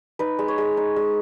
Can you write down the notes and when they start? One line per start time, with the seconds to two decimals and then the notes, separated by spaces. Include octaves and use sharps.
0.19 D#4 B4
0.39 G#3
0.48 C#5
0.58 G#3
0.77 D#4
0.96 G#3